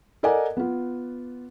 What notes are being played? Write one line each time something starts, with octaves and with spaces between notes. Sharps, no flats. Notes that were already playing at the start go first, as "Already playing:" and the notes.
A4 A#4 D5 D#5 F#5 G#5
B3 F4